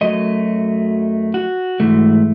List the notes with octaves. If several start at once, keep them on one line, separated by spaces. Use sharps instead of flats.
F#2 D#3 F#3 A3 D#5
F#4
G#2 E3 A3